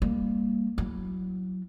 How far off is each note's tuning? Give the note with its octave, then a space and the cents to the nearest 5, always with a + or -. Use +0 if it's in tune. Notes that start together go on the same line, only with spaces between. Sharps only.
G3 +25 A#3 +0
F#3 +0 E4 +0